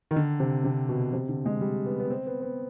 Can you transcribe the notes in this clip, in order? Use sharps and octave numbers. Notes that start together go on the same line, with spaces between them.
D#3
D3
C3
C3
B2
C3
D3
G#3
G3
B3
B3
C4
B3
B3